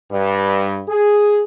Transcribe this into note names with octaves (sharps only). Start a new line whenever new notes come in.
G2
G#4